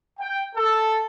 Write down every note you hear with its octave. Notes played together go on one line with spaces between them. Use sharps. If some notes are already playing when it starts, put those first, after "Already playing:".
G5
A4